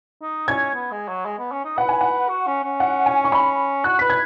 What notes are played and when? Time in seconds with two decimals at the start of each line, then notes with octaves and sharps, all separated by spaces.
0.22 D#4
0.47 C#4 G#6
0.74 B3
0.91 G#3
1.08 F#3
1.25 G#3
1.38 B3
1.52 C#4
1.65 D#4
1.77 B4 F#5
1.89 G#5
2.01 F#5
2.29 F#4
2.47 C#4
2.64 C#4
2.80 F#5
3.06 G#5
3.25 C#6
3.32 B5
3.84 F#4 F#6
3.99 B4 B6
4.10 G#6